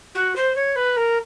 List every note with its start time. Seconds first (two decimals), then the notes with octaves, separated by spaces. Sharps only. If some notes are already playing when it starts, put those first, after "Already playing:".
0.14 F#4
0.35 C5
0.55 C#5
0.75 B4
0.96 A#4